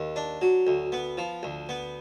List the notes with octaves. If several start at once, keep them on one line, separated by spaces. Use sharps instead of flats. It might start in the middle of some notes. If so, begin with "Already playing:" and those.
Already playing: D#2
D4
F#3
D2
B3
F3
D2
B3